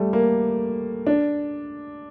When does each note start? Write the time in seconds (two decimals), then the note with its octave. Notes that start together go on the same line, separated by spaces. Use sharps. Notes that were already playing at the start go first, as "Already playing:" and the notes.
Already playing: G3 A3
0.13 A#3
1.07 D4